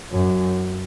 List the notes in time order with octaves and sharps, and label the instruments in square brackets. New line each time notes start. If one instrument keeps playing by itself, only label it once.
[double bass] F#2